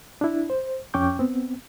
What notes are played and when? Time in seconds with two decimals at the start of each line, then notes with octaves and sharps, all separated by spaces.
0.21 D4 E4
0.50 C5
0.94 F2 C#4 G5 C#6 D6 G6
1.19 B3 C4